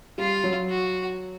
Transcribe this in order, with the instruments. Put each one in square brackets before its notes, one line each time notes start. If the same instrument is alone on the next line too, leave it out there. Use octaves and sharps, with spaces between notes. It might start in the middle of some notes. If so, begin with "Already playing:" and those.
[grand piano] G3 [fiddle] F4
[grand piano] F#3
[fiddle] F#4